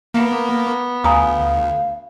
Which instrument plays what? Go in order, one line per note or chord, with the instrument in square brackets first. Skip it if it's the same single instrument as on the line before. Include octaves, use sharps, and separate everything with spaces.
[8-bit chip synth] A#3 [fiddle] B3
[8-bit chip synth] D2 [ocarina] F5 [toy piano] G#5 A#5 D#6